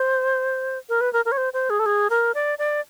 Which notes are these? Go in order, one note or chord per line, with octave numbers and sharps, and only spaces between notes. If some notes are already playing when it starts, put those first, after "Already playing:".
Already playing: C5
A#4
B4
A#4
A#4
C#5
C5
C5
G#4
A4
G#4
A#4
D5
D5